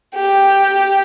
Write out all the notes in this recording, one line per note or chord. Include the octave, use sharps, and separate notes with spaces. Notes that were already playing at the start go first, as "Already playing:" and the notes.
G4